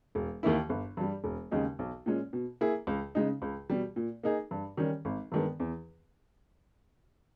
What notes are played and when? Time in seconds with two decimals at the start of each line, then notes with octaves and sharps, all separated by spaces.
0.15 E1
0.43 D#2 D#3 A#3 E4
0.69 G1
0.97 G2 G3
1.24 E1
1.51 D#2 C#3 G#3 D#4
1.79 B1
2.06 A#2 G#3 C#4
2.33 B2
2.61 A#3 E4 G#4
2.87 C#2
3.15 C#3 G#3 D#4
3.42 C#2
3.70 B2 G3
3.96 A#2
4.23 A#3 D#4 G#4
4.51 G2
4.77 D#3 G3 C#4
5.05 G#1
5.32 G2 D#3 G#3 B3
5.60 E2